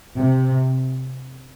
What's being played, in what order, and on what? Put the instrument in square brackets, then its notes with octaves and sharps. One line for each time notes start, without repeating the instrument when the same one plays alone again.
[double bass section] C3